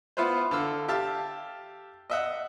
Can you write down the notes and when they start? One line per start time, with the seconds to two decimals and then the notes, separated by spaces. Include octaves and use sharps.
0.17 B3 E4 F4 B4 C5
0.51 D3 F5 E6
0.88 G4 E5 F5 A5
2.10 D#5 E5 F#5